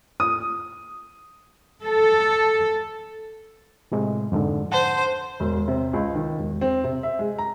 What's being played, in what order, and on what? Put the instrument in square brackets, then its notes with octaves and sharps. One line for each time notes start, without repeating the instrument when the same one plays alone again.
[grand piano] D#6
[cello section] A4
[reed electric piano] A2 C3 G#3
F2 G#2 D3
[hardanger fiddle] C5 [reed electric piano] F#5 A5
[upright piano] E1
C3
C#2
D#3
E1
C4
C3
E5
G#3
A#5